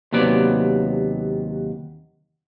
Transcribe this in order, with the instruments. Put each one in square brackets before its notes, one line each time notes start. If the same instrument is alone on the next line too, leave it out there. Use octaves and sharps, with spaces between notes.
[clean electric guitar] D#2 C3 F#3 B3 D5